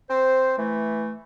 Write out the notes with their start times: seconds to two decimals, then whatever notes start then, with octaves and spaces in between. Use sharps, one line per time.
0.10 C4 C5
0.58 E3 A3